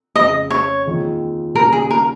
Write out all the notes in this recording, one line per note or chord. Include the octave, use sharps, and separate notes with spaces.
F2 C#3 G#3 C4 D#5
C#5
D#2 D#3 G#3 C4 F4
D#2 C#3 G3 A#4
G#4
A#4